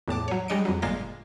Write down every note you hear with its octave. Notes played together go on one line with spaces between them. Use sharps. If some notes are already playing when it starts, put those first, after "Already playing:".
E2 A2 A5 D6
F#3 C#5
G3 G#3 D4 D#5 C#7 D7
F2 F#3
G1 A#2 G#3 A#3 F5 A#6